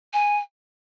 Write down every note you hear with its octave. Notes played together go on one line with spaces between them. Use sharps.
G#5